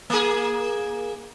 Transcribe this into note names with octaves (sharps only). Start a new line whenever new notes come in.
A#3 G#4